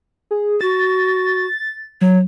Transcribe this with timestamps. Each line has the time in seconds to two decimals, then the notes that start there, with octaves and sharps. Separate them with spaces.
0.31 G#4
0.61 F#4 A6
2.01 F#3 C#5